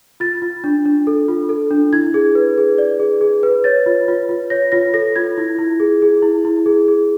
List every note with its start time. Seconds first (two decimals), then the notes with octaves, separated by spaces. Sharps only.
0.20 F4 A6
0.42 F4
0.64 D4
0.85 D4
1.07 A4
1.28 F4
1.49 A4
1.71 D4
1.93 E4 G#6
2.14 G#4
2.35 B4
2.58 G#4
2.78 D5
3.00 G#4
3.21 G#4
3.43 B4
3.64 C#5 A6
3.86 F4
4.08 F4
4.29 F4
4.50 C#5 A#6
4.72 F4 A#6
4.94 A4 A#6
5.16 F4 G#6
5.38 E4
5.58 E4
5.80 G#4
6.02 G#4
6.22 E4
6.45 E4
6.66 G#4
6.88 G#4